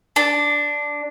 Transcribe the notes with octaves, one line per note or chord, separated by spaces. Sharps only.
D4